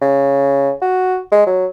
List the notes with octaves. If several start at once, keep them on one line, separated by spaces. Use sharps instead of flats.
C#3
F#4
G#3
F#3